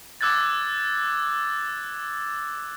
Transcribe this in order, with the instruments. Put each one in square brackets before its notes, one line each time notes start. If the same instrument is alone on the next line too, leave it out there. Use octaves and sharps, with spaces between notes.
[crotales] D6 E6 F#6 G#6 A6